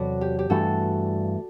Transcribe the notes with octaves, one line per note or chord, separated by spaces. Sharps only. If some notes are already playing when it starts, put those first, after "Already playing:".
Already playing: E2 C3 F#3 F#4 A4 B4 D5
G4
G4
G2 E3 A3 F#4 A4